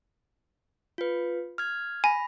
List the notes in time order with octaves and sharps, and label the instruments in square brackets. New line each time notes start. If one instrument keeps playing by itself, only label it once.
[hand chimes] F4 B4
F6 G#6
[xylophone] G#5 [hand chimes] B5 A#6